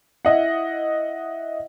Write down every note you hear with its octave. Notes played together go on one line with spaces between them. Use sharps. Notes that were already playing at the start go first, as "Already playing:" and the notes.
E4 D#5 F#5